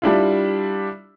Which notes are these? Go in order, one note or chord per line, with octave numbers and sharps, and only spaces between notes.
G3 D4 E4 F4